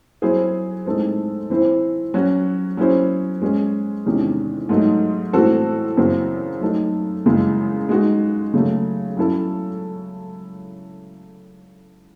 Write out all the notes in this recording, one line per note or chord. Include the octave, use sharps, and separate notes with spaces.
F#3 C4 E4 G#4 C5
A2 G#3 C4 D#4 A4
E3 C4 E4 C5
F#3 C#4 F#4
F#3 C#4 E4 G#4 C5
G#3 C#4 G#4
E2 C3 D#3 G#3 C#4
G#2 F#3 A3 D#4
A2 E3 C4 F#4 A4
F#2 C#3 E3 C4 F#4
F#3 A3 D#4 A4
F#2 C#3 E3 G#3
G#3 D#4 F#4
C#3 F#3 A3
F#3 C#4 E4 A4